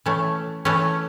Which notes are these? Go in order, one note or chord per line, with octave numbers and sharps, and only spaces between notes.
E3 A3 C#4
E3 A3 C#4